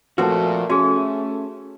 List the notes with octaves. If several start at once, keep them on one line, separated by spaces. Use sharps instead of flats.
A#2 F3 A3 C4 F#4 B4 A5
A3 C#4 F#4 G#4 A4